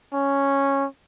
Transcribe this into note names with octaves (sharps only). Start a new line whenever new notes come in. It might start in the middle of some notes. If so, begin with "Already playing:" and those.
C#4